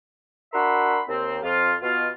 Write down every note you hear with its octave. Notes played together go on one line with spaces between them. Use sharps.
D4 F#4 A#4 E5 B5 C6
D#2 C4
F2 F4
B2 F4